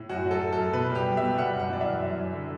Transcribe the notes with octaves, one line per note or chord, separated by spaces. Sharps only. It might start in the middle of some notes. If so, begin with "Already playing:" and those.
Already playing: A2
F#2 F#4
F#3
A4
F#3
A4
F#2
B2 B4
G3
G4
G3
E5
B2
G3 F#5
F#2
F#5
E3 D5
F#2 E5
F#3
F#2
D3